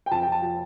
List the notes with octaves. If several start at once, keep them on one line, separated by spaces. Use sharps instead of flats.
G5
F2 A5
G5
F2 A5
F3